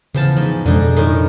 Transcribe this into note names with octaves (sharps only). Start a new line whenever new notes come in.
E2 C#3 F3 A5
G#2
F2 B2 D3 G#3 D#4 G#4
A2 D#3 D#4